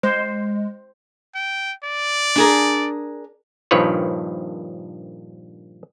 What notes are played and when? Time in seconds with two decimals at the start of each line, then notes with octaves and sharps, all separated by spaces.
0.03 G#3 C5
1.35 G5
1.84 D5
2.36 D4 G#4 A#4
3.71 A#1 G2 D#3 F3 B4 C#5